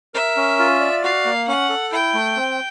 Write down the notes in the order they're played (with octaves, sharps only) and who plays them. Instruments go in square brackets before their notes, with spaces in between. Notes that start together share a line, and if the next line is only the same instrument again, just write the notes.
[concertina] A#4 [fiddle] E5
[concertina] C#4
F4
D5
[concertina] F#4 [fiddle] F5
[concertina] A#3
[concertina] C#4 [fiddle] F#5
[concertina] A4
[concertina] E4 [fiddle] G5
[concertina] A3
C4